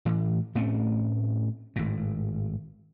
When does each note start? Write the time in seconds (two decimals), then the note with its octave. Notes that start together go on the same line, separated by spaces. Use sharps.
0.05 A2 E3
0.55 A2 A3 C4 C#4
1.76 G#1 A2